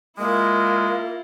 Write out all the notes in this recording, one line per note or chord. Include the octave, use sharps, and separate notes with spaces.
G#3 A#3 E4 F4